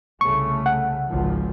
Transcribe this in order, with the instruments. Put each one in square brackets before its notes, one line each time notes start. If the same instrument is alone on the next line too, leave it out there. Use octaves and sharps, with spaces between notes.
[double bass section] C2 C#3 A3 [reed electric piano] C#6
[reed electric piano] F#5
[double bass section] G#1 C#2 F3